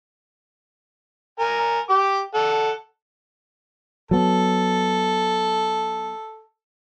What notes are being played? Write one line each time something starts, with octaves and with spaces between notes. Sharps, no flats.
A#4 G#5
G4 D6
A4 F#5
F#3 B3 A4